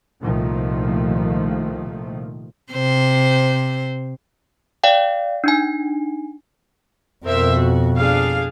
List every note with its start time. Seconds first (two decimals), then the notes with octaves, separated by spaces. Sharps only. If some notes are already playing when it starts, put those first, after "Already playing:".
0.22 C2 A#2 D#3 F3 A3
2.72 C3 C5
4.84 D5 F5 G5
5.44 D4 D#4 G#5
7.25 F2 B2 A#4 C5 E5
7.57 F#4
7.96 D4 G#4 F5